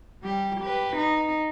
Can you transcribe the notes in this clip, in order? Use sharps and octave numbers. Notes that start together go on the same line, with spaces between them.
G3 G4
G4 B4
D#4